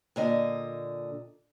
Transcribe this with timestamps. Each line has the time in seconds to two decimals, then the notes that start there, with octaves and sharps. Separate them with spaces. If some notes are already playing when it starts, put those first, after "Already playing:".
0.16 A#2 D3 D#5